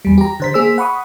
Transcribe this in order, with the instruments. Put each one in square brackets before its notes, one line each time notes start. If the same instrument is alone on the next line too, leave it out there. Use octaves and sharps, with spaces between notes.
[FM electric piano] E2 G3
G4 A#5
D3 C5 B6
A#3 G#4 C5 E6 B6
F#5 B5 C#6 D#6